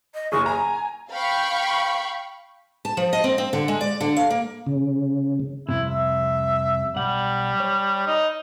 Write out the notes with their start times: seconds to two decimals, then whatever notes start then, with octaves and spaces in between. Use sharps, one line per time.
0.14 D#5
0.32 F#1 G#4 C#6
0.46 G#5 A#5
1.12 F5 G5 B5 C#6
2.85 A5
2.97 F3
3.13 D#5
3.24 C4
3.38 C4
3.53 D3
3.68 G#3
3.81 D5
4.01 D3
4.16 F5
4.30 A#3
4.66 C#3
5.69 C2 F2 C3 E4
5.90 E5
6.96 B1 G3 F#5
7.60 C#5
8.07 D#4